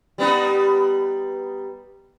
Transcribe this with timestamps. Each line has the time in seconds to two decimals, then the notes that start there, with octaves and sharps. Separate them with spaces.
0.18 G3 B3 D#4